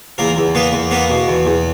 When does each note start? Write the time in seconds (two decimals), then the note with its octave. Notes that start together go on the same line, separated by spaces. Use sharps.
0.18 E2 A#3 A#4
0.37 E2
0.55 A#3 B3 B4
0.73 E2
0.91 A#3 B3 B4
1.10 B2
1.28 E2
1.45 E2